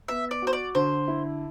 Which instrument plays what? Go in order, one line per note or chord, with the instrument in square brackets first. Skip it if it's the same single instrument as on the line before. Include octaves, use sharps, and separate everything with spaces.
[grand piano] B3 [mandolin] E5
[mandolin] D5
[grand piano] F#4
[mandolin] C5
D5
[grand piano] D3 [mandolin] C5
[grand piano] E4